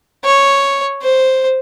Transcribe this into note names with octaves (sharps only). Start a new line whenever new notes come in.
C#5
C5